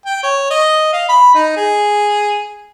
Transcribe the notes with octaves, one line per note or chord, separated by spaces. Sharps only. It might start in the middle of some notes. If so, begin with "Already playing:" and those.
G5
C#5
D#5
F5
B5
D#4
G#4